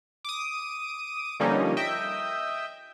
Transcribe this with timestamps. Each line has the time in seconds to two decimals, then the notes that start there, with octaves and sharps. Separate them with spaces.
0.25 D6 D#6
1.40 D3 F3 G3 A#3 C#4 D#4
1.77 D#5 E5 G5